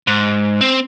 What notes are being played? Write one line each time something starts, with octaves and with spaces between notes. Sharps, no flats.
G#2
C4